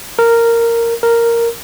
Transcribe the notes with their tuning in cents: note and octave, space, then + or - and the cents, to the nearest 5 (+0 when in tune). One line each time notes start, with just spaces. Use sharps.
A#4 -10
A#4 -5